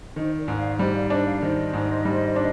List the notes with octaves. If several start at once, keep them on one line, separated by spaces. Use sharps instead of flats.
D#3 C5 D#5
A#4 D5
G#2
D5 F5
G3 C5 D#5
D5 F5
D4 C5 D#5
D5 F5
D#3 C5 D#5
G#2
G3
D4